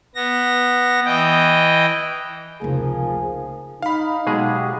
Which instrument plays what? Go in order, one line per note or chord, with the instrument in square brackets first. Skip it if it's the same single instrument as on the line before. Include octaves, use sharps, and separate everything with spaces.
[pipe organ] B3 A#6
E3 D#5 G5
[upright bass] F1 C#2 [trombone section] F3 A#3 G#4
[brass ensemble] D#4 [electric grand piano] F5 B5
[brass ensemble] B1 G4 [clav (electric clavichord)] B2 G#3 G#4